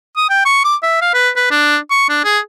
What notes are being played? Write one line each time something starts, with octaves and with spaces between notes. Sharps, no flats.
D#6
G5
C#6
D6
E5
F5
B4
B4
D4
C#6
D4
G#4